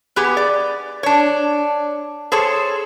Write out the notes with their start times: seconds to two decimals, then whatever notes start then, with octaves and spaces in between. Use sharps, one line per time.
0.16 B3 G4 G#4
0.37 D5
1.03 D4 C#5
2.32 G#4 A4 C5 C#5